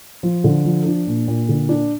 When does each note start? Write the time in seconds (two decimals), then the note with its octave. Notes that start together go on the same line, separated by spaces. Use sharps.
0.23 F3
0.44 D3
0.65 F3
0.86 D4
1.07 A#2
1.28 A#2
1.49 D3
1.69 D4